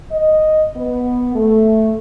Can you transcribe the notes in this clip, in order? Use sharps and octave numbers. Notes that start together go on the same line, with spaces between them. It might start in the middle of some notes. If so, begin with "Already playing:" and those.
D#5
B3
A3